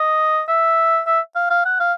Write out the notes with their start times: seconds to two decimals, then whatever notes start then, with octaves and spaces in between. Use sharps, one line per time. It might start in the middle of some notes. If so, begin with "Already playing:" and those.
Already playing: D#5
0.48 E5
1.07 E5
1.36 F5
1.50 F5
1.65 F#5
1.80 F5